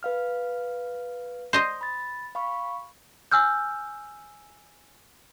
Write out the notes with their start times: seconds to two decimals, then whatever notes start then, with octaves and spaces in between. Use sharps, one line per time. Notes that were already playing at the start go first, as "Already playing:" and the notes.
0.03 B4 F5 F6
1.53 C5 D#5
1.81 B5 A6
2.35 F5 B5 C#6
3.32 G#5 E6 F6 G6